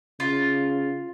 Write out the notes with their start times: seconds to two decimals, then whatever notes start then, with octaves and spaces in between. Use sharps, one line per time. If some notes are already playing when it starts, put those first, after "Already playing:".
0.20 C#3 F4